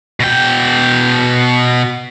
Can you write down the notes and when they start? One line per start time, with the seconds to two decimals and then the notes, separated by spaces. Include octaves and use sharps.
0.20 B2 G5